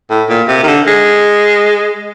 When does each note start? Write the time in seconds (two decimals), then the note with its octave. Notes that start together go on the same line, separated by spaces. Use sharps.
0.10 A2
0.29 A#2
0.48 C3
0.63 D#3
0.67 D3
0.87 G#3